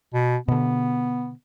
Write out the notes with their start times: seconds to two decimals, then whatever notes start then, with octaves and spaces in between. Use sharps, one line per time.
0.14 B2
0.48 B2 D3 B3